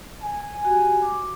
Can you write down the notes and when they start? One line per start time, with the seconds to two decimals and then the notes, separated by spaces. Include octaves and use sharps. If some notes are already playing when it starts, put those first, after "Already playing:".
0.22 G#5
0.65 F#4 G4
1.02 D6